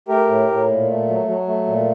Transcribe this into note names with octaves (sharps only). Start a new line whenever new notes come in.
A3 G4 A#4
A2
A2
A#2
A3
F#3
F#3
A3
A#2